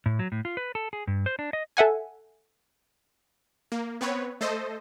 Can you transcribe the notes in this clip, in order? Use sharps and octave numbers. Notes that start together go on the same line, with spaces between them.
A2
F#3
A2
F4
B4
A4
G#4
G2
C5
D4
D#5
A4 E5 F#5 G#5
A#3
B3 C4 B4 C#5
A3 A4 C5 D#5